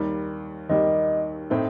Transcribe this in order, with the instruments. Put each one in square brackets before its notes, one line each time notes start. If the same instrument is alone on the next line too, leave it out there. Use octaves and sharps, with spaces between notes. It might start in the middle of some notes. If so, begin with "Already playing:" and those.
Already playing: [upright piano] D#2 D#3 G3 A#3
[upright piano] D#2 D#3 G3 A#3 [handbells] D#5
[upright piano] A2 A3 C4 D#4